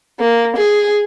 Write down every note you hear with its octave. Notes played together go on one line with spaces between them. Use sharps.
A#3
G#4